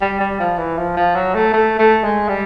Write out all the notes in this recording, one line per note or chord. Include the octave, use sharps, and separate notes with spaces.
G3
G3
F3
E3
F3
F3
F#3
A3
A3
A3
G#3
G3